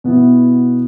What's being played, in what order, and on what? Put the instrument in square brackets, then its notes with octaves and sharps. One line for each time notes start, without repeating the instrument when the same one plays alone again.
[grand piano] B2 B3 E4